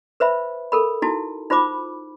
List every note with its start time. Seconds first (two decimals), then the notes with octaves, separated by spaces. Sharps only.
0.20 B4 C5 E5 B5
0.72 A4 A#4 B5
1.02 D#4 E4 F#4 A5
1.50 D#4 F4 C5 B5 D6